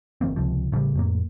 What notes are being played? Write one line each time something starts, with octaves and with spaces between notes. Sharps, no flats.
G1 E3 A#3 C4
C#2 C3 F3
A1 C#3 E3 G3
F2 A2 A#3